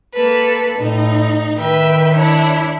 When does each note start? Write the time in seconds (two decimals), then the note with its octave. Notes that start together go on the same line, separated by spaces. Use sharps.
0.14 A#3 A4 B4
0.78 A2 D#4
1.58 D#3 B4 E5 G5
2.14 D4 E4 C#5